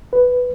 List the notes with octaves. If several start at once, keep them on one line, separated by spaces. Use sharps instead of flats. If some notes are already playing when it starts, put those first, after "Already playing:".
B4